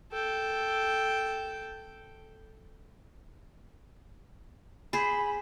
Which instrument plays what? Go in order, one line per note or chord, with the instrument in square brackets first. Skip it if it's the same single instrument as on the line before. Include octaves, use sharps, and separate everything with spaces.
[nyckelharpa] A4 G5
[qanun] G#4 C5 [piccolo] B5